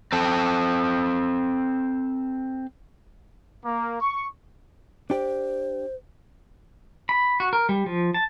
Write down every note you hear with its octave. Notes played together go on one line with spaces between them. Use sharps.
C4 A4
A#3
C#6
D4 G4 C5 D5
B5
F#4
A#4
G3
F3
A5